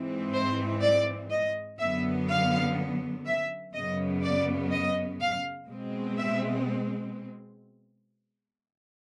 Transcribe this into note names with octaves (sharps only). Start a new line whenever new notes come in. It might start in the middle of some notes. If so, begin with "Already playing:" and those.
Already playing: G#2 E3 G#3 C4
C5
D5
D#5
F#2 D3 F#3 B3 E5
F5
E5
F#2 C#3 F#3 B3 D#5
D5
D#5
F5
B2 G#3 C4
E5